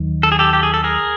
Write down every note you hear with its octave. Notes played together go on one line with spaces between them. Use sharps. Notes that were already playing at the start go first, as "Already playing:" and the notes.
Already playing: D#2 D#3 F#3
A4
G#4
G4 A4
G4
G#4
A4
G#4 A#4